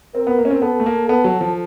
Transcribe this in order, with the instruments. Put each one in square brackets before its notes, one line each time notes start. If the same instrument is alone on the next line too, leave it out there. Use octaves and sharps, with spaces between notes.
[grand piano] C4 [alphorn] A#4
[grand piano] B3
A#3
C#4
C4
[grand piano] B3 [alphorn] A4
[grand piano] A3
A#3
[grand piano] B3 [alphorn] A4
[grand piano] F#3
F3